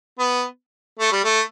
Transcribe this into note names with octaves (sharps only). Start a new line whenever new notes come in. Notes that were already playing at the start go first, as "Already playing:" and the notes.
B3
A3
G3
A3